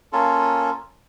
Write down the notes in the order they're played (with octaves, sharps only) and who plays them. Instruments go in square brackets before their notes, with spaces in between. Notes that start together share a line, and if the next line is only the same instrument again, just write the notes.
[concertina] A#3 C#4 F4 A4